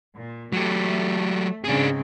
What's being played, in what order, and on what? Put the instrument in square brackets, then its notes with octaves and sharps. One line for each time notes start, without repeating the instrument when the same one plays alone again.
[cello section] A#2
[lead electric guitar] F#3 G4 [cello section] A3
[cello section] G#2 C#3 C4 [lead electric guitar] D4 G#4